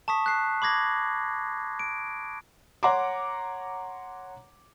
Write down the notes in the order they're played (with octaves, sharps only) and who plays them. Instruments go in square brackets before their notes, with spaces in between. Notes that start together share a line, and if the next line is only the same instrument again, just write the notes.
[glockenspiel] A5 C#6 D#6 B6
F#6 C7
B5 D6 G#6 A#6
D7
[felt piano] C#5 F#5 A#5 C6 D6